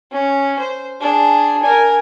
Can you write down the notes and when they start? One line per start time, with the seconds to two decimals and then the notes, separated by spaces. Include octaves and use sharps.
0.12 C#4
0.59 C5
1.01 D4 G#4
1.63 A#4 G#5